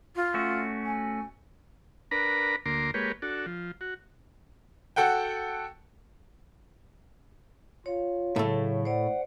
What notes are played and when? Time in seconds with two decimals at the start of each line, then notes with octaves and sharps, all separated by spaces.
0.16 F4
0.34 A3 C#4 F#4
0.85 G#5
2.11 D4 A#4 B4 A#5 B5
2.66 D2 A#3 A#5 C6 D6
2.94 G#3 A#3 G4 B4 C#5
3.22 D4 F#4 A4
3.46 F3
3.81 F#4
4.96 F#4 A4 F#5 G5
7.86 F4 C#5 F5
8.36 A2 C#3 F#3 A3
8.85 C5 D5 F#5